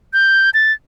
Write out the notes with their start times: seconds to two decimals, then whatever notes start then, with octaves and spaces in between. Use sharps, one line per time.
0.13 G6
0.54 A6